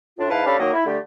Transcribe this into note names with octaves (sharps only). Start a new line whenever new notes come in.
A2 D4 F4
G#2 E4 B4 F5 A5
C#4 D4 G4 A4 F5 B5
D#3 F#3 A#3 A#4 D#5
E4
D3 G3 A3 G4